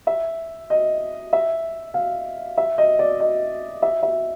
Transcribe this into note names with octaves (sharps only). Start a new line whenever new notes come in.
E5
D#5
E5
F5
E5
D#5
D5
D#5
E5
E5